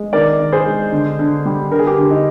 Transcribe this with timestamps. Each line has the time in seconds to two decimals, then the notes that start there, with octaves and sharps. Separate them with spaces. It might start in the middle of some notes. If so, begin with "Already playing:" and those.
Already playing: G#3
0.13 D#3 A#4 D5
0.40 D#3
0.52 G#4 C5
0.66 G#3
0.92 D3
1.19 D3
1.46 G3
1.71 D3 A#4
1.79 G#4
1.87 G4 A#4
1.98 D3
2.11 D#4